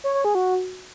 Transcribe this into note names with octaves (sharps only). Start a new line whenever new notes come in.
C#5
C#5
G#4
F#4